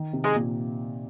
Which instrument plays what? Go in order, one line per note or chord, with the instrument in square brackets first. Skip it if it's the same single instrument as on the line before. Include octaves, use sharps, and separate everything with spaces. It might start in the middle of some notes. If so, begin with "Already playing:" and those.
Already playing: [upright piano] D#3
C3
[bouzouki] G#3 D#4 G#4
[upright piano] A#2